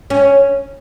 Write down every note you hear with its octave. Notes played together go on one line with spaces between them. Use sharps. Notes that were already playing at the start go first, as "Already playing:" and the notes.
C#4